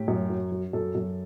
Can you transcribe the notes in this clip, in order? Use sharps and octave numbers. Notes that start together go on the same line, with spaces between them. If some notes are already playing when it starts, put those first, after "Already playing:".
Already playing: A2 G4
F#2
F#3
F#3
F#2 A4
F#2